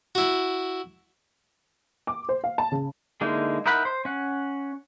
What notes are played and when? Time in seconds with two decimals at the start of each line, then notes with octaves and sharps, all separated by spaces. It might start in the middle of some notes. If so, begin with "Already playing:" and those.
0.15 E4 F#4
2.07 D6
2.29 C5
2.44 F5
2.58 A5
2.72 C#3
3.21 D3 G#3 A#3 D#4 E4
3.66 D#4 E4 A#4 F#5 B5
3.85 C5
4.05 C#4 F#5